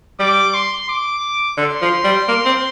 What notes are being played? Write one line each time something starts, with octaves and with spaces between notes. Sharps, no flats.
G3 D6
C6
D6
D3 C6
F3
G3
A#3
C4